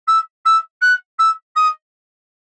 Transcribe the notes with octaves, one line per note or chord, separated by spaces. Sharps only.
E6
E6
F#6
E6
D#6